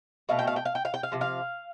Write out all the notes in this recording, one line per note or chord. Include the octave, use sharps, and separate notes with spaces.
B2 A3 F5
G5
F5
G5
F5
G5
F5
G5
F5
C3 F3
F5